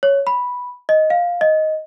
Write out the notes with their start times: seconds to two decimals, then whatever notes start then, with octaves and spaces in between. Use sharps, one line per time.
0.03 C#5
0.27 B5
0.89 D#5
1.10 F5
1.41 D#5